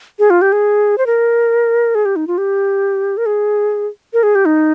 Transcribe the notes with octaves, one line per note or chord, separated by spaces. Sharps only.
G#4
F4
G4
G#4
C5
A#4
G#4
G4
D#4
F4
G4
A#4
G#4
A#4
G#4
G4
D#4